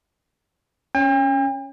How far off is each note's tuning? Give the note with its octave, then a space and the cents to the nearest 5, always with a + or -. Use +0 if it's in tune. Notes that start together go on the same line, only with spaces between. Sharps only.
C#4 +0 G5 +45